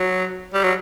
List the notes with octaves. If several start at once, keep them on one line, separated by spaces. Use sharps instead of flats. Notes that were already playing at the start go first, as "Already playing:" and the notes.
Already playing: F#3
G3
F#3